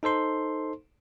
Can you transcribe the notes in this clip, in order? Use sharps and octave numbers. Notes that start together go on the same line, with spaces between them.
D#4 A4 C5 C6